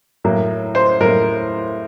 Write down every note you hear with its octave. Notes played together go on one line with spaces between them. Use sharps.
A2 F#3 A#3
C5
A2 F#3 A#3 A#4